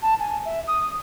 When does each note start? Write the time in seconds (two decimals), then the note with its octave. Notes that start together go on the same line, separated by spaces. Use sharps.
0.02 A5
0.19 G#5
0.44 E5
0.67 D#6